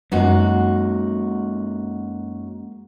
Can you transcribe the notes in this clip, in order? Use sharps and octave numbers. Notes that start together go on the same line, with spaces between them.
F#2 G#3 A#3 D#4 F#4